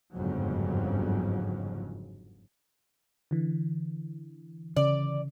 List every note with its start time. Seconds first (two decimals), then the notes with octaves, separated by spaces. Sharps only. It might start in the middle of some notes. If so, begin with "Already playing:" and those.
0.15 G1 F2 G#2 C#3 F#3
3.31 D3 E3
4.76 C#3 D5